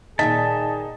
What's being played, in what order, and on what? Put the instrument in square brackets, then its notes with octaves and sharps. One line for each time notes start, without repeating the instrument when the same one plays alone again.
[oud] A#2 D#3 E5 [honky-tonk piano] D#4 [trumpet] G#4 [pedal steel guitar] A5